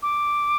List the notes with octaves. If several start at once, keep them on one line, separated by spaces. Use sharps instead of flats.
D6